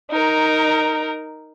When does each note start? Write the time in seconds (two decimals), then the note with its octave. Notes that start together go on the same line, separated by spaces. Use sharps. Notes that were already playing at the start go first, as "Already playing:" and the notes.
0.11 D#4 A#4